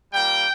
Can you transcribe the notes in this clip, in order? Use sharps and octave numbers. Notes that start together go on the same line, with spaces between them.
G3 A#3 F4 G5